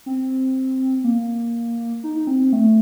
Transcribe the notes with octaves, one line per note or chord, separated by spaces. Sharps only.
C4
A#3
D#4
D#4
C4
C4
A3